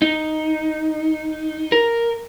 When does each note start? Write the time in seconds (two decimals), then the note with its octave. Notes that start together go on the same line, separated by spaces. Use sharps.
0.02 D#4
1.72 A#4